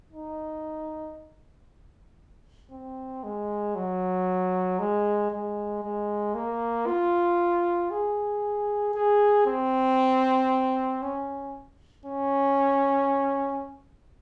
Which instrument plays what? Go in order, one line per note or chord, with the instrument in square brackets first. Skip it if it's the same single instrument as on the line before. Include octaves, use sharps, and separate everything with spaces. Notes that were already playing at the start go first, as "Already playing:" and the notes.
[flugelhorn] D#4
C4
G#3
F#3
G#3
G#3
G#3
A#3
F4
G#4
G#4
C4
C#4
C#4